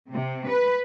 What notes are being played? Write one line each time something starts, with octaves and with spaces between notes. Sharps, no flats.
C3
B4